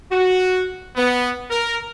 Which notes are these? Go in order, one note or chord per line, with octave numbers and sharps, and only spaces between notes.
F#4
B3
A#4